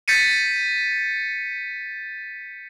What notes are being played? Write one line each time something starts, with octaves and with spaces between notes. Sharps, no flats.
G6 A6 B6 C#7 D#7